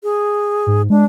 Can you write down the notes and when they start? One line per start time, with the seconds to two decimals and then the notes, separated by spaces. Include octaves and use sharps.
0.03 G#4
0.67 G#2
0.90 G#3 D4